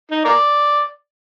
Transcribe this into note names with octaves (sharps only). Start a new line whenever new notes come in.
D#4
A#4 D5